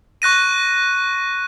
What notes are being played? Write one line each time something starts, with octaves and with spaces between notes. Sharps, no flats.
C#6 F#6 A#6 D#7